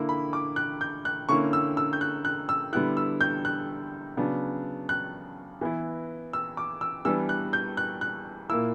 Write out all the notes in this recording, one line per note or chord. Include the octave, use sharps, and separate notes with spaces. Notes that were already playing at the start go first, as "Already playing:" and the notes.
Already playing: D3 A#3 E4
B5
D6
F#6
G6
F#6
D3 A#3 C#4 E4 C#6
E6
E6
G6
F#6
F#6
E6
D3 G3 B3 E4 F#6
E6
G6
F#6
C#3 F#3 B3 D4
F#6
E3 B3 E4
E6
D6
E6
E3 G3 B3 D4 E6
F#6
G6
F#6
F#6
A#2 A#3 E4 E6